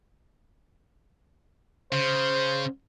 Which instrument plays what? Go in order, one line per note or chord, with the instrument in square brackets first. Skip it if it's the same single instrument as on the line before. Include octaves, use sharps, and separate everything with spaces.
[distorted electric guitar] C#3 [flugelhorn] C5